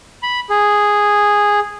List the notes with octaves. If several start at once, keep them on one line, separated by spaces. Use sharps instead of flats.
B5
G#4